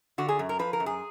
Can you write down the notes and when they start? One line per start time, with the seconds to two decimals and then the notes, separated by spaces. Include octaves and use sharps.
0.18 D3 F#4
0.29 G#4
0.39 F#2
0.49 A#4
0.59 F3 B4
0.73 A#4
0.80 F#2
0.86 G#4